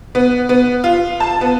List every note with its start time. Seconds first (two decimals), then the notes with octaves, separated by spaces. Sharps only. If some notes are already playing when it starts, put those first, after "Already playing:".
0.15 B3
0.49 B3
0.84 F4
1.20 A5
1.41 B3